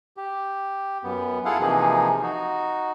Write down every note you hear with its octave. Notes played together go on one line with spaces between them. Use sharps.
G4
F#2 B3
E4 F4 G#4 A4 F5 F#5
C3 E3 F3 A#3 D#4 G#4
D#4 F#4